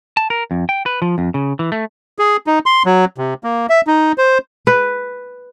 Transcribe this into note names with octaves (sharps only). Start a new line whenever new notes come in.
A5
A#4
F2
G5
B4
F3
F2
C#3
E3
A3
G#4
D#4
C6
F#3
C3
A#3
E5
D#4
C5
B4